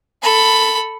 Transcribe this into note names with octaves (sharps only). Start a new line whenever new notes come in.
A4 B5